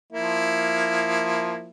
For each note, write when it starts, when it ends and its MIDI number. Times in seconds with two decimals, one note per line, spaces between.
0.12 1.70 53
0.12 1.70 58
0.12 1.70 64